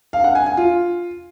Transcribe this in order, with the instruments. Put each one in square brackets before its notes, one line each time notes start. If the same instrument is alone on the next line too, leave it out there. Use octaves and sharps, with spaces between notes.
[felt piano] F5
F#5
G#5
G#5
F4